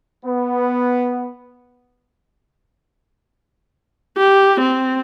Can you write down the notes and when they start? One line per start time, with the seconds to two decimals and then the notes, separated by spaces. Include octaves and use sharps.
0.25 B3
4.17 G4
4.60 C4